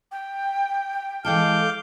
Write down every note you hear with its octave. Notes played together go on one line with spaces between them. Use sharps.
G5
E3 G#3 A4 F5 D6 G6